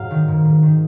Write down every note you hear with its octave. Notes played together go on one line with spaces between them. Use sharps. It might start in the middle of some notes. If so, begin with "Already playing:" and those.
Already playing: G#2 F#3 F5
D#3
G#2
G#2
D#3